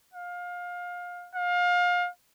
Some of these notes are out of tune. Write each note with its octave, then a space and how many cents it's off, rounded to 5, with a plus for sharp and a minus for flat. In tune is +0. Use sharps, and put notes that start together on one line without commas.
F5 +25
F5 +30